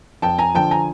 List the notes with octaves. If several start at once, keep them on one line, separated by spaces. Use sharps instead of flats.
F2 G5 A5
G#5 A#5
D3 F3 G5 A5
G#5 A#5